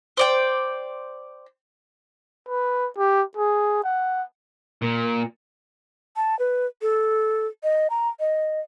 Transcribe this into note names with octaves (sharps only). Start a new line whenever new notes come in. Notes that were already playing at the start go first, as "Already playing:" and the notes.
C5 D5 G5
B4
G4
G#4
F#5
A#2
A5
B4
A4
D#5
A#5
D#5